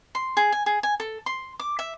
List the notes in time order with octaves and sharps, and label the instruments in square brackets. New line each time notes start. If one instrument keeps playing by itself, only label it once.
[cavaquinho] C6
G#4
G#5
G#4
G#5
A4
C6
D6
E5